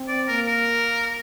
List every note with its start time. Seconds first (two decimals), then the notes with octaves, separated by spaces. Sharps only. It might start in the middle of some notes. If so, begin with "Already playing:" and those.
Already playing: C4
0.08 D5
0.28 A#3 A#4
0.48 A#4